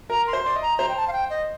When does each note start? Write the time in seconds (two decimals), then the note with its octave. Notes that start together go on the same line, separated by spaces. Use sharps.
0.10 A#4 A#5
0.27 C6
0.33 C5
0.44 D5 C6
0.56 D#5
0.62 A#5
0.78 C5 A#5
0.89 G5
0.97 A5
1.08 F5
1.13 G5
1.30 D#5